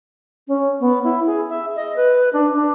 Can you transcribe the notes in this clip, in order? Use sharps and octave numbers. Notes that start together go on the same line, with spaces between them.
C#4
B3
E4
G#4
E5
D#5
B4
D4
D4